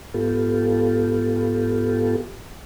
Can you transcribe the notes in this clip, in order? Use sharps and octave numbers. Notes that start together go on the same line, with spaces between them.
G#2 B3 F4 G4 A4